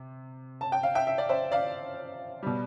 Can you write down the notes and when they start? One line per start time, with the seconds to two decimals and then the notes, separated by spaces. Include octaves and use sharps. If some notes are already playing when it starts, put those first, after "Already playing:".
Already playing: C3
0.61 A5
0.72 G5
0.83 F5
0.95 E5 G5
1.07 E5
1.18 D5
1.29 C5 E5
1.52 D5 F5
2.43 B2 G3